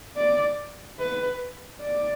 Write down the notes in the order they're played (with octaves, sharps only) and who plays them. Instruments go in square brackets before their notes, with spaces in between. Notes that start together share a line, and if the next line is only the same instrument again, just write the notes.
[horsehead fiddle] D5
B4
D5